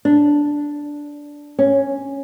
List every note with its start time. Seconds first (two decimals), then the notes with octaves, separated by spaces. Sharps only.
0.05 D4
1.59 C#4